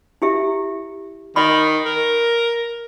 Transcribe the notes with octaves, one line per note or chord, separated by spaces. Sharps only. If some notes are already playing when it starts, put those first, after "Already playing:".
E4 G4 E5
D#3 D#5 B5
A#4